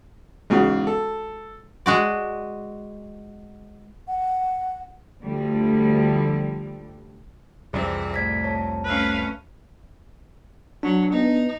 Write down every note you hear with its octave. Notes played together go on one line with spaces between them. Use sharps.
E2 G#2 C#3 G#3 F#4
A4
G#3 F#4 D5
F#5
D2 D3 F3 G3
C2 F2 E3 C4 G#4 D5
A2 D5 G#6 B6
C#5 A5
A3 C#4 B4 F5
F#3 D4
B3 D#4